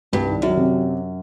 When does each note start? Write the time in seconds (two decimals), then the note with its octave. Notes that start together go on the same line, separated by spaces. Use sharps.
0.13 C2 G2
0.27 D#3
0.42 F#2 F#3
0.57 C3